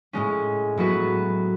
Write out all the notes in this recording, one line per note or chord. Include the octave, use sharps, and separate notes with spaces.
A2 G#3 C#4
A2 F#3 B3 F#4 B4